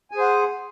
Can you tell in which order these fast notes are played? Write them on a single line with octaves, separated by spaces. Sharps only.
G#5 G#4 C5 F#5